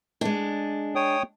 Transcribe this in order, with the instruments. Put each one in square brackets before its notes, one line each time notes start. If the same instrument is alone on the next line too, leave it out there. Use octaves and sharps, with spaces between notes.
[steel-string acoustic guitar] G#3 D4
[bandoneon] C#5 G5 D#6